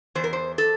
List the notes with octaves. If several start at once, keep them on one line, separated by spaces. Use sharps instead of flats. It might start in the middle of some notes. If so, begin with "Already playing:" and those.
E2 C5
A#4
C5
A4